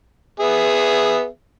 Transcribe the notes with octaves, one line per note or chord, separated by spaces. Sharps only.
B3 G#4 E5